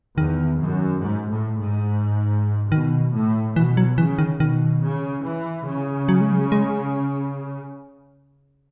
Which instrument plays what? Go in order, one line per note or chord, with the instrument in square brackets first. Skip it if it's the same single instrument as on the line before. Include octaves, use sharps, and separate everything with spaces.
[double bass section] E2 [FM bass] D#3
[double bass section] F#2
G#2
A2
G#2
[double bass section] B2 [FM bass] D#3
[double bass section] A2
[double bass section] B2 [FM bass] E3
[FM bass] F#3
[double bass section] C#3 [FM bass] E3
[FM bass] D#3
[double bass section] B2 [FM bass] D#3
[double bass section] C#3
E3
C#3
[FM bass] F#3
G#3
F#3
G#3